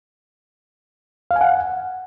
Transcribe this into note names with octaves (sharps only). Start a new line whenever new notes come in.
F5
G#5
F#5